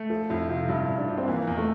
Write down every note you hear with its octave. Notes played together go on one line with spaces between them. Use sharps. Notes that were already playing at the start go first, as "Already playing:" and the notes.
Already playing: A3
F3 A4
F2 E4
C3 F4
G2 E4
G2
D4
F3
C4
E3 A#3
E2
A3